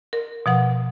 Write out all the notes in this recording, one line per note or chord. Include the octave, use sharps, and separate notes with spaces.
A#4
B2 F3 F#5